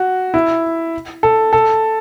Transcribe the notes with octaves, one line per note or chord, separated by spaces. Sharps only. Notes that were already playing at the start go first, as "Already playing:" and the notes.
Already playing: F#4
E4
A4
A4